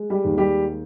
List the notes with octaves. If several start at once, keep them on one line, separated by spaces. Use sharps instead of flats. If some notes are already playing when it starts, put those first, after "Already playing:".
Already playing: G#3
G3 G4
D#2
G3 G4